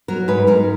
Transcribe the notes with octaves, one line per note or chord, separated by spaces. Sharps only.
F#3 A#4
G#2 B4
G#2 A#4